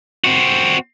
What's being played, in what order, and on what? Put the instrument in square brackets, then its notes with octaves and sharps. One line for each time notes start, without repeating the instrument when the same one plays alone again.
[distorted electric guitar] C4 F#4